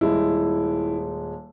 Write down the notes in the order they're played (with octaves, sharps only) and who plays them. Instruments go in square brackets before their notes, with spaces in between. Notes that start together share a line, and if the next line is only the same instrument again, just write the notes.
[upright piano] D#1 G#3 [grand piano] E4